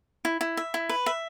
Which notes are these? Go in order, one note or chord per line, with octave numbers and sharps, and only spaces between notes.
E4
E4
E5
E4
B4
E5